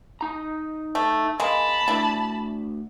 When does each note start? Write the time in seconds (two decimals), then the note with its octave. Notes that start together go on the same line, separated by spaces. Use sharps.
0.21 D#4 A#5
0.95 A3
1.40 G#3 A#3 A5 B5
1.88 D2 D4 E4